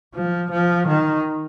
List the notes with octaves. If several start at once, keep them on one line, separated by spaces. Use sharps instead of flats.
F3
F3
D#3